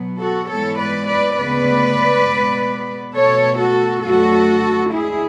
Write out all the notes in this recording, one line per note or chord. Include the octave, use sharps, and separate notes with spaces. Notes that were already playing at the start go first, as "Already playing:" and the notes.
Already playing: B2 F#3 B3
F#4 A4
G#2 E3 G#3 B3 A4 C#5
B4 D5
B4 D5
D2 C#3 G#3 B3 B4 D5
B2 G#3 B3
B2 A3 A4 C#5
F#4 A4
F#2 D3 F#3 A3 F#4 A4
D2 D3 G#3 E4 G#4